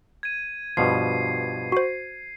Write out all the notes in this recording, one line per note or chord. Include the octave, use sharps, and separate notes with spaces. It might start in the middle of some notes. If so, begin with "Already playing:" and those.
G#6 D#7
G2 B2 F3 C7
F#4 C5